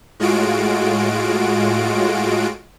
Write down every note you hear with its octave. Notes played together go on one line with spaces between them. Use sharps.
A2 G#3 F4 F#4 D7